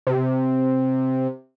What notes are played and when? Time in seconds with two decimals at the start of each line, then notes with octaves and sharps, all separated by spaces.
0.07 C3